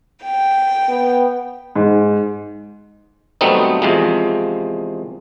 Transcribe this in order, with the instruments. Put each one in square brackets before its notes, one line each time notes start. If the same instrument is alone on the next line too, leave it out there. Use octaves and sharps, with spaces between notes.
[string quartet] G5
[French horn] B3
[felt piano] G#2
[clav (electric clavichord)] F#3 G3 A3 B3 C4 D#4
E2 C3 F3 G#3